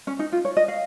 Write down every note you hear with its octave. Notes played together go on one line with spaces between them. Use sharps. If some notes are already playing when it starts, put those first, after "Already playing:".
C#4
D#4
F4
C#5
D#5
F5